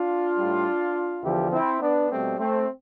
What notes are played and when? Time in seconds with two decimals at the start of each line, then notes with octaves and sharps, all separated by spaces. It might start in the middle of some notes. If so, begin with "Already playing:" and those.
Already playing: D4 F4
0.37 A2 G3
1.23 E2 D3 F3 E4 G4
1.52 C4 E4
1.81 B3 D4
2.10 B2 G3 A3 C4
2.39 A3 C4